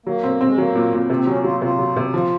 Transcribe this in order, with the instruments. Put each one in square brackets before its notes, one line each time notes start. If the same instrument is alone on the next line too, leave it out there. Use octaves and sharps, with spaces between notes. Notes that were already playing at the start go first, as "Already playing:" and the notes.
[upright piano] F#3 [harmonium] A#3
[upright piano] C4
C4
[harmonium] G#3
[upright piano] F#3 [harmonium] A#3
[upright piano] A#2
A#2
C3
[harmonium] C4
[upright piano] F#3 [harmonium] C#4
[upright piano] F#3 [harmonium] F4
[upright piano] C3 [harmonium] F4
[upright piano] F#3
C3
[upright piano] F3 [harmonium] F4